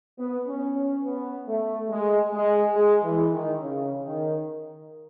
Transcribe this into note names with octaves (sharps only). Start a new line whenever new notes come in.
B3
C#4
C#4
B3
A3
G#3
G#3
G#3
E3
D#3
C#3
D#3